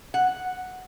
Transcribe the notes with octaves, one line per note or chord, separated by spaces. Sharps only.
F#5